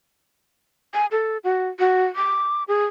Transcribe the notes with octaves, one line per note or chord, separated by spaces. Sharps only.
G#5
A4
F#4
F#4
D6
G#4